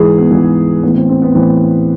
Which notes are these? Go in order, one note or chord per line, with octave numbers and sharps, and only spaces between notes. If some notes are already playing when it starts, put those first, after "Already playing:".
Already playing: G#2 E3 G#4
B3
G#2 E3
A2 E3 B3
C4
C4
B3
A2 E3 C4